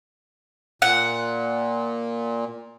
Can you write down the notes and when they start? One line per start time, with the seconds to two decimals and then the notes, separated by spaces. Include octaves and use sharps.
0.82 A#2 F#5